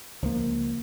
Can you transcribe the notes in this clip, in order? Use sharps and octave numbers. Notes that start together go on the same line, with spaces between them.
C#2 F3 A#3